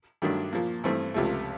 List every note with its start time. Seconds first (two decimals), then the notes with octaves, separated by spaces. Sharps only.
0.22 G2 D#3 F#3 A3 D4
0.53 A#2 F3 A#3
0.84 G2 E3 A3 C4
1.14 C#2 C3 F3 A3